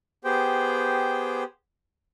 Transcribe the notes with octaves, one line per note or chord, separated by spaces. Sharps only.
B3 G4 G#4 C5 G5